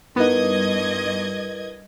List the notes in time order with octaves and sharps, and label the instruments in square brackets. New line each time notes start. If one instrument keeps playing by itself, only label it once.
[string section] G2 D#5 G#6 [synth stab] B3 D#4 [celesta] E4 A#4 B4